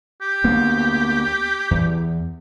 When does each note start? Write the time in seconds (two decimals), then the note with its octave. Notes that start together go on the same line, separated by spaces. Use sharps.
0.21 G4
0.44 D2 A#3 B3
1.71 E2